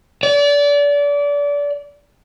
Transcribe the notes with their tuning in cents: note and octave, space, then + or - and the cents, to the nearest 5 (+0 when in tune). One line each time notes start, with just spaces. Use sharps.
D5 -30